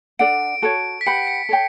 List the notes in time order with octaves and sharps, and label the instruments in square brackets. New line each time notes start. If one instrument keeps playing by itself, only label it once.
[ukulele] D4 A4 D5 F#5 [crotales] D7
[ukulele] F#4 A4 C#5
[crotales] B6
[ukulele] G4 B4 F#5 B5 [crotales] C#7
[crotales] C#7
[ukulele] A4 C#5 G5